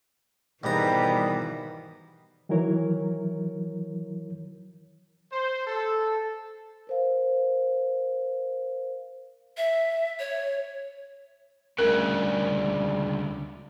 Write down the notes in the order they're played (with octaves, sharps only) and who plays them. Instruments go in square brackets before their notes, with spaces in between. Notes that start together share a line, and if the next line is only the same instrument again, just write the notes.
[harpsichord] G#2 A#5 [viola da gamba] B2 E3 [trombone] D#3 [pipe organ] G3 B3 G4
[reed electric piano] D#3 E3 F#3 E4 A#4 C#5
[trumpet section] C5
A4
[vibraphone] A#4 C5 F5
[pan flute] E5
C#5
[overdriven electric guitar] D2 C#3 [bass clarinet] G3 [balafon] A#4